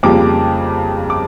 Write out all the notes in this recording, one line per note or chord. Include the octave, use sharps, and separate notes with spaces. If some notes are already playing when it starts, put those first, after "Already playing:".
F2 C#3 G3 A#3 D6
D6